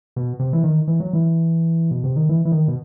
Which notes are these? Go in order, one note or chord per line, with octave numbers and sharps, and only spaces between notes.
B2
C3
E3
D#3
E3
F#3
E3
B2
C3
D#3
E3
E3
D#3
B2